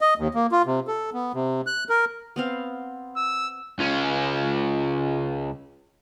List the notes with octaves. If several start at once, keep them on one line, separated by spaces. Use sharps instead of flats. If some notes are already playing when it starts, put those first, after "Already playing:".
D#5
D#2
A#3
F4
C3
A4
B3
C3
F#6
A#4
B3 C4 F5
E6
C#2 C#4